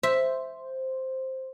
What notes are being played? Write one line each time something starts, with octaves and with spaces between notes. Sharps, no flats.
C5 E5